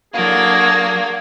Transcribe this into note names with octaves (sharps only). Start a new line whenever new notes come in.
F#3 A#3 D4 F#4 G#4 A4 F5